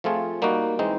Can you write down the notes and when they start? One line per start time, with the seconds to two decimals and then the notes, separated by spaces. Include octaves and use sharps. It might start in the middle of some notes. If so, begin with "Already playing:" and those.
0.04 F3 A3 C4 F4 G#4
0.42 G3 A#3 D#4 F#4
0.79 E3 G#3 C4 D#4